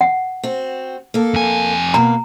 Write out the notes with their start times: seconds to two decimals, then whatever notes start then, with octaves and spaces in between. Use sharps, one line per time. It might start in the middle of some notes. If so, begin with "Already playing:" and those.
0.01 F#5
0.43 C4 F#4
1.14 A#3 A4
1.34 F2 G#5
1.94 B2 A#3 A#5